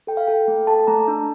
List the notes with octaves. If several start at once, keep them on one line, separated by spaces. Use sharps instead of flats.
A4 G5
F5
A4 G5
A3
A4 A5
A3 A#5
D4 A5